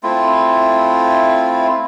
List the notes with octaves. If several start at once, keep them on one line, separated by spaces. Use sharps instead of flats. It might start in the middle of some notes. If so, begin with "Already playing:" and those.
A3 C4 E4 F4